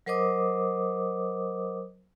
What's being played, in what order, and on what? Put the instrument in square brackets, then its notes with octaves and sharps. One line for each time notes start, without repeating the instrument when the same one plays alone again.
[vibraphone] F#3 A#4 C5 D#5 D6 D#6